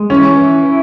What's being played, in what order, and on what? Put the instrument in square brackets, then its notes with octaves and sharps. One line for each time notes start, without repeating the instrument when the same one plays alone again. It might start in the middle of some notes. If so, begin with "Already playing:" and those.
Already playing: [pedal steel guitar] G#3
[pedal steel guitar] E3 [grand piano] C#4
[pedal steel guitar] E3
E4